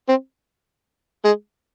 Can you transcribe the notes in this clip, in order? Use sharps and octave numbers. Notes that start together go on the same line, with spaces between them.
C4
G#3